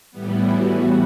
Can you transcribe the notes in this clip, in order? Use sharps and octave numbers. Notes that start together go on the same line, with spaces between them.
A2 E3 G3 B3
F#4